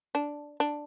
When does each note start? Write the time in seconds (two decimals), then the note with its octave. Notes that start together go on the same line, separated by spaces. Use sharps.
0.15 D4
0.60 D4